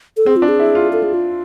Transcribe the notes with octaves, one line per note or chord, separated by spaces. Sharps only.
A4
C4 G#4
F4
D4
G#4
E4
F4
A4
G#4
F4